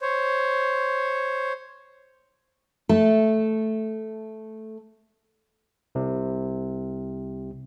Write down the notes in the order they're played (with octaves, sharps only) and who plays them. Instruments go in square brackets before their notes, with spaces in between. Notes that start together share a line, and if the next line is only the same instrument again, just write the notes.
[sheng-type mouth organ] C5 C#5
[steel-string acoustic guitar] A3 A4
[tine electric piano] C2 C3